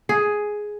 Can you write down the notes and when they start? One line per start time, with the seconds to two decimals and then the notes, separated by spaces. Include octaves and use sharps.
0.09 G#4